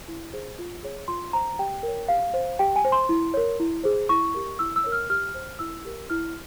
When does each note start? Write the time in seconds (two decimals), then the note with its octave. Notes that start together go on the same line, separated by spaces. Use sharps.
0.08 E4
0.33 G#4 C5
0.59 F4
0.83 G#4 C#5
1.08 F4 C6
1.33 C5 A#5
1.59 G4 G5
1.83 A#4 C#5
2.08 G4 F5
2.34 C5
2.59 G4 G5
2.76 G#5
2.84 C5
2.92 C6
3.09 E4
3.34 A#4 C#5
3.60 E4
3.84 G#4 C5
4.09 E4 C#6
4.34 G4 A#4
4.59 E4 E6
4.76 E6
4.84 A#4 C#5
4.92 F6
5.10 G4 F6
5.34 C5
5.59 E4 E6
5.85 G4 A#4
6.10 E4 F6